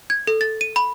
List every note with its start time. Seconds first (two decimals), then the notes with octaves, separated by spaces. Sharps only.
0.10 G#6
0.27 A4
0.41 A6
0.61 D#7
0.76 B5